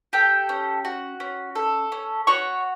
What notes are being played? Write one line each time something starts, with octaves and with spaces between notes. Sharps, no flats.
G4 A4 G5
C#4
F#4
C#4
A4
C#4
F#4 C#5 C#6